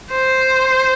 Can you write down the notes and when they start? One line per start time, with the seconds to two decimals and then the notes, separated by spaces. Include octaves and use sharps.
0.11 C5